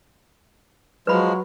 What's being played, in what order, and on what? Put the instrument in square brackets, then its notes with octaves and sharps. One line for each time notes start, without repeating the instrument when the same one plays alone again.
[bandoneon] F3 G#3 [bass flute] F#3 [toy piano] B4 B5